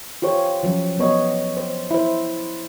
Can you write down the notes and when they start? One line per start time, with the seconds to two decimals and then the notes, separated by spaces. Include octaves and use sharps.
0.22 F4 G4 C5 C#5
0.63 F3 F#3 C#4
0.98 F#3 B3 C#5 D#5
1.57 C5
1.91 E4 C5